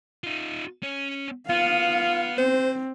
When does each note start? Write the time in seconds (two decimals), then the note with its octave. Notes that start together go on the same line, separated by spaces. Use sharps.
0.24 D#4 F4
0.83 C#4
1.49 B3 F4 F5
2.38 C4 C5